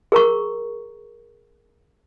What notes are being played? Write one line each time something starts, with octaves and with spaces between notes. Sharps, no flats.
G#4 A#4 A#5 C#6